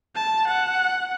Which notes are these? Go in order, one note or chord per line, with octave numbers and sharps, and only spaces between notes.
A5
F#5